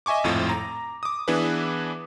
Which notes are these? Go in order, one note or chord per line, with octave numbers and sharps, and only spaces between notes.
D#5 E5 G#5 C#6 D6
G#1 F2 A2 F4
A#5
D6 D#6
E3 B3 D4 E4 G#4 B4